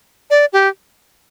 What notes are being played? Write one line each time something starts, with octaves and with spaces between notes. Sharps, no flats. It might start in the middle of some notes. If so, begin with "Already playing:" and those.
D5
G4